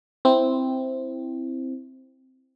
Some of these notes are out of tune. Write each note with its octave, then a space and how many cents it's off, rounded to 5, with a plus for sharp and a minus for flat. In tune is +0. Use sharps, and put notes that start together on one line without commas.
C4 +0 E4 +0